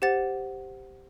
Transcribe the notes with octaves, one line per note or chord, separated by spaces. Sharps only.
G4 C5 F#5 A6